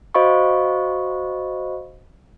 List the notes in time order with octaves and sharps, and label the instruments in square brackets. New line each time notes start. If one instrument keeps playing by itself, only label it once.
[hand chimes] F#4 C5 D#5 F5 B5 C#6